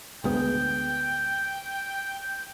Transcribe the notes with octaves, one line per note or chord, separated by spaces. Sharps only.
D2 G#3 B3 G5